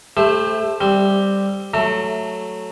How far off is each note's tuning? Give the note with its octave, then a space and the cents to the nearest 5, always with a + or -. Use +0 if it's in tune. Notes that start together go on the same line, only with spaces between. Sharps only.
A3 +0 G4 +35 C5 +0
G3 +0 C4 +0
F#3 +0 A3 +0 A#5 -40